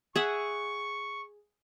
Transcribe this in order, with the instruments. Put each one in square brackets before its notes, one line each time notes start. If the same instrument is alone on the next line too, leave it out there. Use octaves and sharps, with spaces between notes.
[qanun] G#4 E5 F#5 [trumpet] C#6